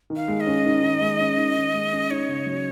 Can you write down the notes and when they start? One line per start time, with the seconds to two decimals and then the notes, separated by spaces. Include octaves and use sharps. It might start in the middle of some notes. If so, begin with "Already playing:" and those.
0.10 D#3
0.16 F5
0.28 G#3
0.40 D#5
0.47 C#4
0.65 D#3
0.82 D#3
1.01 G#3
1.20 C#4
1.37 D#3
1.55 D#3
1.74 G#3
1.92 C#4
2.10 D#4 C#5
2.29 C#3
2.46 F#3